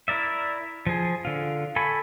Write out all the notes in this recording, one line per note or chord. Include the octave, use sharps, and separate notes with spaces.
E4 A#4 D5 E5
F3 G#4
D3 F4
A4 G#5 B5 C#6